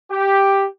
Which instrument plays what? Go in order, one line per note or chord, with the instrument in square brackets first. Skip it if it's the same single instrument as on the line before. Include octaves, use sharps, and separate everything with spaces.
[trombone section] G4